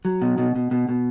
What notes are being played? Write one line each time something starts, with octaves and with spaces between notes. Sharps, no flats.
F#3
B2
B2
B2
B2
B2